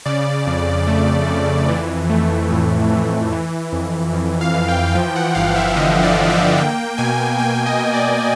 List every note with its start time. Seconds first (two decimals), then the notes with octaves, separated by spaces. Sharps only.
0.06 C#3 D5
0.47 F2
0.87 A3
1.28 F2
1.68 E3
2.10 A3
2.51 A2
2.92 E3
3.32 E3
3.72 F2
4.13 F2
4.41 F5
4.54 E3
4.68 G5
4.95 F3 G5
5.16 F#5
5.35 G1 F5
5.56 E5
5.76 D3 D#5
6.03 D5
6.17 D3
6.30 E5
6.57 A#3 G5
6.98 B2 G#5
7.39 A#3 G5
7.66 D#5
7.80 B2
7.93 D5